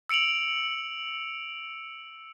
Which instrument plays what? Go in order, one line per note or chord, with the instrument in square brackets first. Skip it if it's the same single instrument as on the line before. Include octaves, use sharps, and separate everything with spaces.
[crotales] E6 C#7 D7 F7 F#7